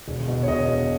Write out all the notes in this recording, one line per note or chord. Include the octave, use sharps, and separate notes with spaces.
E1
B2
C#5
E1 D#5
B2